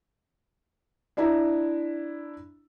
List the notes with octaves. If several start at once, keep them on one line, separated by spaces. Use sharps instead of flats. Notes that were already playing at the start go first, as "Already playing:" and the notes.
D4 E4 E5 A#5